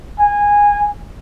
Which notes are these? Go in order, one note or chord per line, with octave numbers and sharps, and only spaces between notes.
G#5